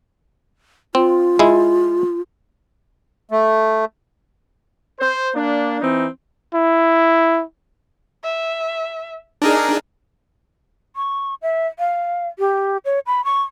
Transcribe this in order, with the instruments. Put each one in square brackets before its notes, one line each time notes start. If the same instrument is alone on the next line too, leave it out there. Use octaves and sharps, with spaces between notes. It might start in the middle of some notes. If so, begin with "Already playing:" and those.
[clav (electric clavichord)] C4 [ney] F4
[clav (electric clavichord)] G#3 E4
[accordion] A3
[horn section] C5
A#3 D4
E3 C4 D#4
[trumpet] E4
[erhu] E5
[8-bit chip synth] D4 D#4 G#4 [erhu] A#4
[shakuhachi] C#6
E5
F5
G4
C#5
B5
C#6